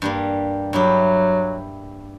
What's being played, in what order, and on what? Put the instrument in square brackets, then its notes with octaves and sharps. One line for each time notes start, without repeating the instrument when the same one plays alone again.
[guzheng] G2 G3 A#3
[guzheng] G2 E4 G4 [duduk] F#3